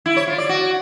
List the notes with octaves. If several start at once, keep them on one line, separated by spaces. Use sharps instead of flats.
E4
C#5
F4
D5
F#4